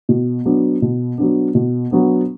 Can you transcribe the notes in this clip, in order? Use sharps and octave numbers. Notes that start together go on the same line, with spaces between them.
B2
F#3 B3 D4
B2
F#3 B3 D4
B2
F#3 B3 D4